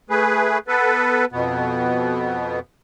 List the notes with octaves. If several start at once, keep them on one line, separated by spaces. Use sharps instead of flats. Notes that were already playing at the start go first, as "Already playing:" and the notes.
A3 G#4 B4
B3 A4 B4
F2 B2 B3